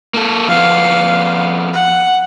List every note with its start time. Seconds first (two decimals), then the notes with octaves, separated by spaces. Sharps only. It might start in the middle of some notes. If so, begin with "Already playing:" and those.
0.14 A#3 A4
0.48 F2 B3 F5
1.73 F#5